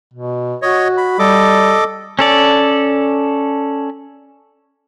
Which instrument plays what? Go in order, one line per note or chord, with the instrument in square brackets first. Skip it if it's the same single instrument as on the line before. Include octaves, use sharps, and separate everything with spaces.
[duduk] B2
[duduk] F#4 [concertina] C#5 D#5
[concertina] B5
[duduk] G3 [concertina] A4 D#5 D6
[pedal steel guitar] C#4 A4 D5